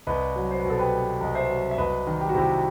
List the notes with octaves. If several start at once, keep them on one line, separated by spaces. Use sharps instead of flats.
C2 B4 D#5
F#3
C5
B4
B2
A4
G4 B4
B3
C2 D#5
C5 E5
F#3
E5
C2 B4 D#5
D#3
G4
F#4
C3 E4 G4